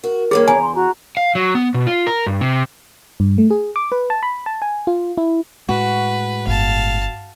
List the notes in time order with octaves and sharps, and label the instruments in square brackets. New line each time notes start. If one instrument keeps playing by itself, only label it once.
[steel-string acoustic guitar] F#4 [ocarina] A#4
[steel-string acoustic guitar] G2 D#3 A#3 [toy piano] G#4 [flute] C#5
[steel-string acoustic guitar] E2 [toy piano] G#5 [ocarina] A#5
[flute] C6
[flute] F#4 [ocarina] A#5
[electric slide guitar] F5
F#3
B3
B2
F4
A#4
G2
C3
[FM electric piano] G2
A3
G#4
D6
B4
A5
B5
A5
G#5
F4
E4
[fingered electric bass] A2 G#3 [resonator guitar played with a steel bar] F#4 [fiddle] B4
[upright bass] G1 [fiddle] F5 A5